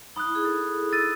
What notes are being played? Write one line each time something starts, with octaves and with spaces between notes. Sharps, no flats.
D#4 B5 D#6 F#6
E4
G#4
A4
E6 A6 D#7